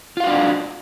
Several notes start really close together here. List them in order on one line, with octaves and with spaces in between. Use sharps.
F4 F5 F#4 D4 D5